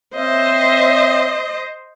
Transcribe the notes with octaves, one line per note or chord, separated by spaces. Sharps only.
C4 C5 C#5 D#5 E5